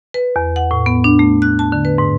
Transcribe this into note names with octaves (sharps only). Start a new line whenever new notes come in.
B4
E2
F#5
A2
B3
D4
A3
F#6
A5
D3
B4
G#2